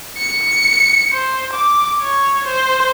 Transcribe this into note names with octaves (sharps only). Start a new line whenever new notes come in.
C#7
C5
D6
C#5
C5